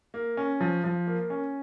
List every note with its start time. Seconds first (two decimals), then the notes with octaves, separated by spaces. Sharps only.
0.14 A#3
0.37 C#4
0.60 F3
0.84 F3
1.07 A#3
1.30 C#4